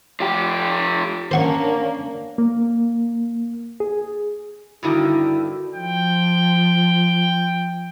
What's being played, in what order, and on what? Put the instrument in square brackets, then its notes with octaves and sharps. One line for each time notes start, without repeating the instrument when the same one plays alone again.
[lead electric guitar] F3 G4
[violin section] A#3 C#4 D4 [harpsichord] C5 F#5 C#6
[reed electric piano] A#3
G#4
[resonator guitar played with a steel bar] G2 D3 D#3 [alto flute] E4 [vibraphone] F#4
[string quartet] F3 [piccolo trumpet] G5